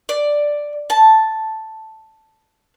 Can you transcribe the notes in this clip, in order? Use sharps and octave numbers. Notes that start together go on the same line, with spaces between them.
D5
A5